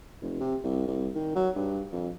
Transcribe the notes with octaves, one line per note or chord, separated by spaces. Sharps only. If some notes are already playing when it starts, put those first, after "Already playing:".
F1
C3
C2
C2
D#3
F#3
G2
F2